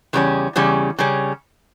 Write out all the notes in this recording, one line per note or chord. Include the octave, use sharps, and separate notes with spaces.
E2 C#3 G3 C#4
E2 C#3 G3 C#4
C#3 G3 C#4